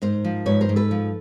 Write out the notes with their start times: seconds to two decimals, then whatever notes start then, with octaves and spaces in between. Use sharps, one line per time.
0.02 G#2 A#4 C5
0.25 F3
0.46 G#2 B4 C#5
0.61 A#4 C5
0.69 G#2
0.76 A4 B4
0.91 F3